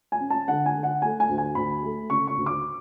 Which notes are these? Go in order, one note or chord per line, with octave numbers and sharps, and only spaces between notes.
G#5
C#4
A5
D3 F#5
G#5
D3
F#5
A3 G#5
G#5
D2
G#5
D2 B5
A3
C#3 C#6
C#6
D2
D6